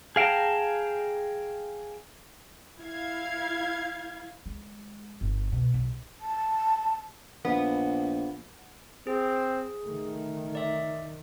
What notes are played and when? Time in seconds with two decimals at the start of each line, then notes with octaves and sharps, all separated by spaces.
0.16 G#4 F5 G5 A5 A#5
2.79 E4 F5 G#6
4.46 G#3
5.21 G1
5.52 B2
5.74 B1
6.21 A5
7.45 A#1 B3
9.07 C4 G#4
9.87 D#3 A3
10.55 D5 E5